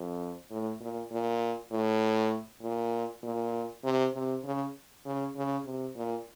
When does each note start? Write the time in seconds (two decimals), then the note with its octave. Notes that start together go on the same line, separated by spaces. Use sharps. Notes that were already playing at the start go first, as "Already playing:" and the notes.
Already playing: F2
0.51 A2
0.81 A#2
1.11 A#2
1.72 A2
2.62 A#2
3.23 A#2
3.84 C3
4.14 C3
4.44 C#3
5.05 C#3
5.36 C#3
5.66 C3
5.96 A#2